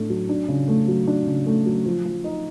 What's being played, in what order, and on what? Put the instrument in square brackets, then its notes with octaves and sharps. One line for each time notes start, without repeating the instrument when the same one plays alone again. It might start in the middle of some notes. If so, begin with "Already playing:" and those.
Already playing: [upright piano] A2 A3 D4
F#3
D4
C#3
A3
F#3
D4
C#3
A3
F#3
F3
F3
D#4